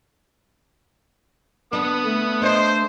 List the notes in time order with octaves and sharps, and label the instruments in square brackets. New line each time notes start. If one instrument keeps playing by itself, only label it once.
[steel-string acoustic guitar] D3 D4 [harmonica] B3 D#6
[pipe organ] A3
[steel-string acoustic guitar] D4 D#5 [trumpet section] C5